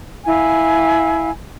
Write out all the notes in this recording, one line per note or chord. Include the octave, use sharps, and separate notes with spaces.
E4 F5 G#5